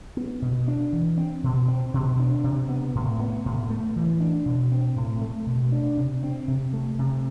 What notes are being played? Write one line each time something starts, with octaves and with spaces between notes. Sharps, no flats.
B3
B2
D4
E3
C4
B2
C4
B2
D4
C3
B3
A2
B3
A2
A3
E3
D4
B2
C4
A2
A3
B2
D4
C3
C4
C3
A3
C3